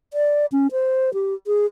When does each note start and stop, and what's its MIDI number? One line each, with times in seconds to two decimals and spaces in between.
0.13 0.46 74
0.52 0.67 61
0.72 1.13 72
1.14 1.34 67
1.47 1.66 68